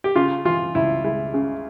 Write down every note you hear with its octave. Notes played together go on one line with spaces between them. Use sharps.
G4
C#3 F4
E3 F4
C#2 E4
G#3 E4
C#3